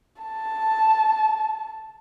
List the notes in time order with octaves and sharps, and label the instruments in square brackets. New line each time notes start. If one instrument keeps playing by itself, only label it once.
[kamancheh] A5